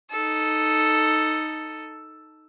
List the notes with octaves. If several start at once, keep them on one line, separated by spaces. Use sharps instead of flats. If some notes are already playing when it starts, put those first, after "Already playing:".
D#4 A4